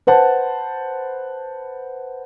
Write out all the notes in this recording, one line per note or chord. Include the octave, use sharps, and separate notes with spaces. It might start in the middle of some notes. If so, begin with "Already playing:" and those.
B4 C5 F#5 A5